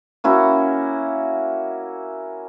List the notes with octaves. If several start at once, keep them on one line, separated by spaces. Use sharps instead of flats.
A#3 C#4 E4 F#4